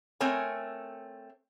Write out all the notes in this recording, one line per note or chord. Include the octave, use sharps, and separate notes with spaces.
A3 C4 A#4 C#5 G#5